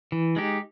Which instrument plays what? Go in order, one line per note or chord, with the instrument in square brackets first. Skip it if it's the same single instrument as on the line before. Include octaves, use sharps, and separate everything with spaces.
[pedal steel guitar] E3
G#3 D#4 G4